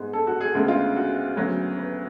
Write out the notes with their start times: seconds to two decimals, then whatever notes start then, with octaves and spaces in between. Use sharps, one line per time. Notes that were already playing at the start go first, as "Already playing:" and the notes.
Already playing: G#2 G#3 B3
0.13 A4
0.27 F#4
0.41 G#4
0.55 D2 C#3 G#3 B3
0.68 F4
0.96 F#4
1.37 D2 C#3 F#3 B3
1.79 B4